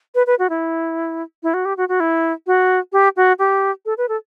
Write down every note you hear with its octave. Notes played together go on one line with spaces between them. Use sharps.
B4
B4
F#4
E4
E4
F#4
G4
F#4
F#4
E4
F#4
G4
F#4
G4
A4
B4
A4